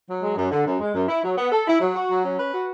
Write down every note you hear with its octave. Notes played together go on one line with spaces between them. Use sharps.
F#3
G#3
F#2
D3
F#2
G#3
F#2
E4
F#3
B3
A4
E4
F#3
F#4
F#3
C#4
B4
F#4